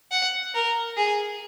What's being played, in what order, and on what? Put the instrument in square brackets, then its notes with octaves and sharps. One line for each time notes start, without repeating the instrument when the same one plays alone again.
[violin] F#5
A#4
G#4